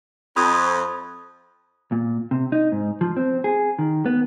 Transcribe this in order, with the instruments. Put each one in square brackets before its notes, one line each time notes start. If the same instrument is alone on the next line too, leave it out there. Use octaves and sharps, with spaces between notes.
[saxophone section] F2 [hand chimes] B5 D#6
[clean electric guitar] A#2
C3
D#4
G#2
F3
C4
G#4
D#3
B3